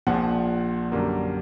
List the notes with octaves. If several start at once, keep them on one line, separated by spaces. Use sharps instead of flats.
A#1 A#2 F3 F#5
F#2 D3 G3 A#3